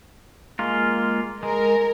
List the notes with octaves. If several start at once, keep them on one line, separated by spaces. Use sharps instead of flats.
G#3 A#3 F4
G#3 A#4